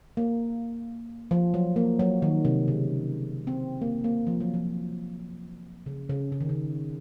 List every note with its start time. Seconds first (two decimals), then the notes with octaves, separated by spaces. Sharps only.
0.17 A#3
1.31 F3
1.54 F#3
1.76 A#3
1.99 F#3
2.22 D#3
2.45 C3
2.68 C#3
3.47 C4
3.82 A#3
4.04 A#3
4.27 F3
4.40 F#3
4.54 F3
5.86 C#3
6.10 C#3
6.32 C#3
6.41 D#3
6.49 C#3